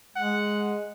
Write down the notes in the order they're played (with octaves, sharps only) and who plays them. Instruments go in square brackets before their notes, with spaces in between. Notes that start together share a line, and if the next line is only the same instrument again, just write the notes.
[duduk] G#3 [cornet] F#5